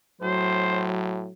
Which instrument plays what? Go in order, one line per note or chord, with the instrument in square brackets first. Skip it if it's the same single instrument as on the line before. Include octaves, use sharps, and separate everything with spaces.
[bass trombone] A2 [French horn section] F#3 [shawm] C5